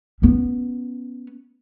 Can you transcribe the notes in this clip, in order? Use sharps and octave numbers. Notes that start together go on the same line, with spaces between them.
B3 C#4